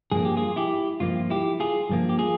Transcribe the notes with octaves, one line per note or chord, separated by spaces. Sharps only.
G2 F3 A#3 G#4
G4
F4 G#4
E4 G4
G2 F3 A#3 F4
E4 G4
F4 G#4
G2 F3 A#3
G4
F4 G#4